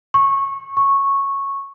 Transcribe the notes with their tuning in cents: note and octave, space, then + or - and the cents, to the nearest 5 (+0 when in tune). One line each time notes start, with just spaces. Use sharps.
C#6 -20
C#6 -10